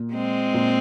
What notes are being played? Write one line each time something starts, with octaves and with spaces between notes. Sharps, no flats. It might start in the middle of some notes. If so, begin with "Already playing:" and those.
Already playing: A#2
G#3 C4
A#2